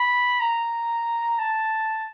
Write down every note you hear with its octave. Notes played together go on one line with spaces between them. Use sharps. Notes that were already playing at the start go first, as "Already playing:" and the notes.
Already playing: B5
A#5
A5